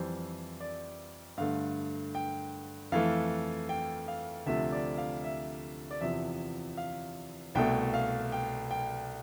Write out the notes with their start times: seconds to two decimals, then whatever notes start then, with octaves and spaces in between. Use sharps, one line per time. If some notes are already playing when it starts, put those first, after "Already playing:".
Already playing: F2 E3 G3 C5
0.60 D5
1.38 G2 D3 A3 F5
2.15 G5
2.92 F2 E3 A3 F5
3.69 G5
4.08 F5
4.46 D2 C3 F3 A3 E5
4.72 D5
4.98 F5
5.24 E5
5.91 D5
6.01 E2 C3 F3 E5
6.77 F5
7.55 C2 B2 A3 G5
7.94 F5
8.32 G5
8.71 G5